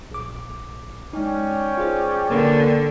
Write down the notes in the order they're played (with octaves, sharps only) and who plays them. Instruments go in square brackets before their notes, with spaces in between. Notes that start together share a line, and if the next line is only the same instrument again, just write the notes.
[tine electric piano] A#1 D6
[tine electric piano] G#3 D#4 [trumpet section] C#4 D5 G5
[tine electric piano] F4 G#4 C5
[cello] D3 [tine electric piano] A#3 A#4 B4